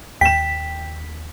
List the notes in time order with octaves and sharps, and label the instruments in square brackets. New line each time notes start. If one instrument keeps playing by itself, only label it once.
[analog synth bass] D#2 [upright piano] G5 E7 [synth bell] B6